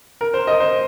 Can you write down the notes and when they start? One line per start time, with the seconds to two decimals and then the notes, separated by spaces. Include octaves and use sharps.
0.21 A#4
0.34 C5
0.47 D#5
0.60 C5